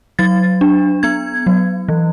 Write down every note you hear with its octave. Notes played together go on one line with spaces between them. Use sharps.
F#3 A6
D4
B3 G#6
F#3
E3